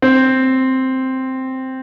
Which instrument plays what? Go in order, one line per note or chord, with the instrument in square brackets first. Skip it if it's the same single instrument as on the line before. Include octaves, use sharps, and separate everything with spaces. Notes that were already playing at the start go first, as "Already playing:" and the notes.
[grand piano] C4